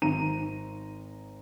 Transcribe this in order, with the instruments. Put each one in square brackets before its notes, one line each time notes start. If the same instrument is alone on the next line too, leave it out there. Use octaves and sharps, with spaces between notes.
[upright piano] G#1 A#5 D#7